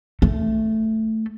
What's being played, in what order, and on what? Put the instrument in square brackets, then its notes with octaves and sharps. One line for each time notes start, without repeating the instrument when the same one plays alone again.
[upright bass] A3